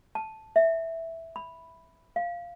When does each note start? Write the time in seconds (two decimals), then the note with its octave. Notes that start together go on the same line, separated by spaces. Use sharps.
0.15 A5
0.56 E5
1.36 B5
2.16 F5